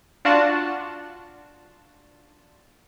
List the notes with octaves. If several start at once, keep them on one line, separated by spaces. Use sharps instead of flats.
D4 F4 F#4 A5